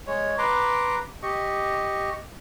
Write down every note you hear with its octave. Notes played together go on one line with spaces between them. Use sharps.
G#3 C#5
B4 A#5 C6 D6
G4 D#5 C#6